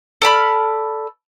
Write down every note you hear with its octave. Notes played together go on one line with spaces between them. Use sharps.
A4 D5 B5 F6